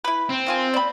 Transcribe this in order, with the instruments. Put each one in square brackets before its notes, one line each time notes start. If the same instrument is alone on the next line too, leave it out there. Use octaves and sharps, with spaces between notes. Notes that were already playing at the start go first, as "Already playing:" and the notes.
[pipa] E4 B4
[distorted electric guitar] C4
[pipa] D#3 F4 G#5
D5 B5